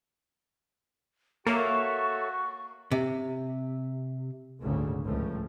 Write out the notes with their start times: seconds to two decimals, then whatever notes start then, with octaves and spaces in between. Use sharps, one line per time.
1.47 A#3 F#4 A4 C#5 E5 C#6
2.91 C3
4.61 G#1 D2 G2 A#2 C#3
5.04 C#2 A2 F3